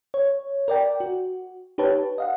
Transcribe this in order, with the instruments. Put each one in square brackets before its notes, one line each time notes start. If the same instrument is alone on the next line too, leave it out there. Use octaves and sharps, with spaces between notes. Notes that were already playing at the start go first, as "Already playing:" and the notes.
[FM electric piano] C#5
A#4 D5 G5
F#4
D#4 G4 B4 C#5 A5
D#5 F5 F#5